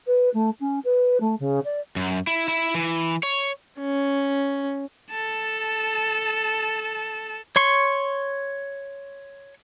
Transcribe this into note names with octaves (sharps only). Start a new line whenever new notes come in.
B4
A3
C#4
B4
A3
C#3
D5
F#2
E4
E4
E3
C#5
C#4
A4 A5
C#5 C6 C#6